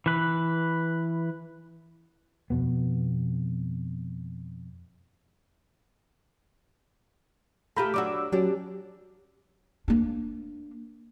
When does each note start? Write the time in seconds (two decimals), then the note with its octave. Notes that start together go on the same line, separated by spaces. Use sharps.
0.06 E3 B4
2.50 F2 B2 B3
7.77 A3 F4 G4 A#5 B5 G6
7.94 F#3 D4 F#4 D6 E6
8.32 F#3 C#4 D4 G4 D5
9.88 A#3 D4